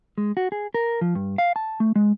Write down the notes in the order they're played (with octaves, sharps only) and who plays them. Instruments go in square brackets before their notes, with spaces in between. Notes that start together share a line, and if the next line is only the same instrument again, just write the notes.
[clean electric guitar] G#3
F#4
G#4
A#4
F3
G2
F5
A5
A3
G#3